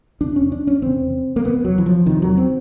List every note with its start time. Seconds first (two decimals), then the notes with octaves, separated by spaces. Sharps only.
0.21 E2 C3 D4
0.36 C#4
0.52 D4
0.67 C#4
0.82 E2 C3 C4
1.36 A#3
1.44 E2 C3 B3
1.65 F#3
1.78 E3
1.86 F3
2.06 E2 C3 D#3
2.22 F#3
2.37 C4